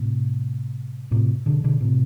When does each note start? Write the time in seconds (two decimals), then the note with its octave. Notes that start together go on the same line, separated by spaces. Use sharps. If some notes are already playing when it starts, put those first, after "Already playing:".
Already playing: A2 C3
1.11 A2 C3
1.46 B2 D3
1.64 B2 D3
1.81 A2 C3